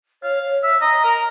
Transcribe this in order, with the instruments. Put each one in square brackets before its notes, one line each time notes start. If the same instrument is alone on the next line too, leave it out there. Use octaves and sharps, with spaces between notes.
[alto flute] C#5 [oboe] F5
[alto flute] C#5
[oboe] E5
[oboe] D#5 [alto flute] A#5
[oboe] A#4